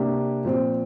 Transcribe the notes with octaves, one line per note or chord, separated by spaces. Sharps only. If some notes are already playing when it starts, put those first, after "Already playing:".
Already playing: C3 A#3 D4 G4
A#2 F3 C4 C5